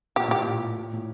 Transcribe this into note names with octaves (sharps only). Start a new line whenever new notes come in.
A#2 G4
A2 G4
A#2
A#2
A2